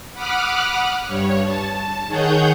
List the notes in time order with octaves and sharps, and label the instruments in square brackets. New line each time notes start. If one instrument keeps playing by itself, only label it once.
[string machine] F#5 B5 D6 D#6 F6 F#6
G2 C#5
A5
D#3 G#4 C#5 F#5 G6